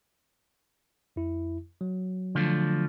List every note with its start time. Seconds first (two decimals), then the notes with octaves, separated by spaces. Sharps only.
1.16 F2 E4
1.81 F#3
2.35 D3 F3 A3